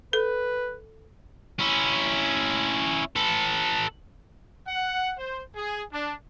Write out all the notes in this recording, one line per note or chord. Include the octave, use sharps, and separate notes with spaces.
A4 B4
C#4 E4
A4 B4
F#5
C5
G#4
D4